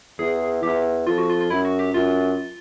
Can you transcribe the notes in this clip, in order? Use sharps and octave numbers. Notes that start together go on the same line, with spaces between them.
E2 G#4
E2 G4
F2 F4
F#4
F4
F4
F#2 E4
F#4
G4
F#2 F4